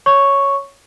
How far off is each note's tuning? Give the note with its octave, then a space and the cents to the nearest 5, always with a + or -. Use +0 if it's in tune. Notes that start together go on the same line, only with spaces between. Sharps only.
C#5 +0 C#6 +0